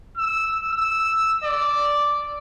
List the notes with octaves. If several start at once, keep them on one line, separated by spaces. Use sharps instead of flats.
E6
E6
D5